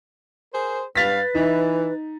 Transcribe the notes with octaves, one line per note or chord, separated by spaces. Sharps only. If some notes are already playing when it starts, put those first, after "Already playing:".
G#4 A#4 C5
G2 B4 F5 A6 B6
E3 D#4